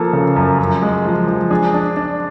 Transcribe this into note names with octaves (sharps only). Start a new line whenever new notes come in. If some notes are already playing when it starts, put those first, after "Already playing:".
Already playing: F3 A#3 A4
C#3
F#2
F#2
G#3
F3
F3
D4 G#4
D4
D4